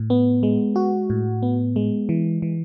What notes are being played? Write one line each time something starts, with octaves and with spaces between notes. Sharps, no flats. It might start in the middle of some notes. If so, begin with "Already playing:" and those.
Already playing: A2
B3
G#3
F#4
A2
B3
G#3
E3
E3